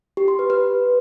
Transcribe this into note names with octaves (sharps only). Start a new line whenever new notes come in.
G4
C6
B4
B4